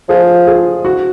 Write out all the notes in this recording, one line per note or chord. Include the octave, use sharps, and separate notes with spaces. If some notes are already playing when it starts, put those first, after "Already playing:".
F3 G#4
G#4
F#4